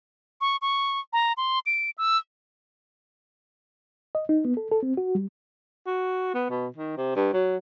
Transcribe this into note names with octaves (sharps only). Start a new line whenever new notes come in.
C#6
C#6
A#5
C6
D7
E6
D#5
D#4
B3
A4
A4
C4
F#4
G3
F#4
B3
B2
D#3
C3
G2
F#3